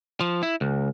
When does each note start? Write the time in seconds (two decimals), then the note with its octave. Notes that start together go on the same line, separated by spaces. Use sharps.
0.21 F3
0.43 E4
0.61 C#2